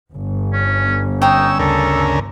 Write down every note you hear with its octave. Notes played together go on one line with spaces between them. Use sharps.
G1
C#4
C#4 D#4 G5 A#5 C6 E6
D2 C#3 A4 A#4